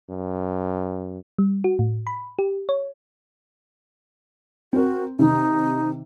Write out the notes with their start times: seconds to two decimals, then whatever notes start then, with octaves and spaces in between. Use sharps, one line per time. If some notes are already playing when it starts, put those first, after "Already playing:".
0.10 F#2
1.38 G3
1.64 F#4
1.79 A2
2.07 B5
2.39 G4
2.69 C#5
4.73 C4 F#4 A#4
5.19 C3 D#3 D#4